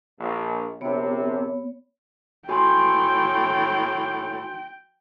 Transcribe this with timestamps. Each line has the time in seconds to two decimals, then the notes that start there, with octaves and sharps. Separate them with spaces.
0.19 A#1
0.81 A#1 C3 B3 C#5
2.49 A2 F#4 G5 G#5 C6